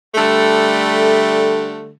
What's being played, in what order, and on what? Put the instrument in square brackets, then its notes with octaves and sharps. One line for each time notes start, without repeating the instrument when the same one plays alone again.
[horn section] D3 G3 A3